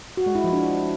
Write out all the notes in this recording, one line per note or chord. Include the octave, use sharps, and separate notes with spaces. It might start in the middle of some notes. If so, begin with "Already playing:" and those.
F#4
G#3
E4
F3
D4